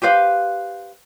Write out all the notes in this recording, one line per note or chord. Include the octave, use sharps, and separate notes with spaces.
G4 B4 C5 F5